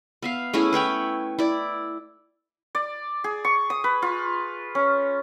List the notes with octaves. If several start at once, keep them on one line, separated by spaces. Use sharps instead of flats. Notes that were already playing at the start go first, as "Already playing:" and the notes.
B3 E5 F5
A3 C#4 E4 G#4
B4 C#5 G5 B5
E4 D5
D5
G#4
C#6
D#6
B4
F4
C#4